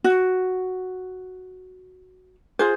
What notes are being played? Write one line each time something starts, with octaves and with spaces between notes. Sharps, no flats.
F#4
F4 G#4 C5